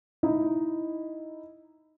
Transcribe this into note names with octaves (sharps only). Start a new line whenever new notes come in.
D#4 E4 D#5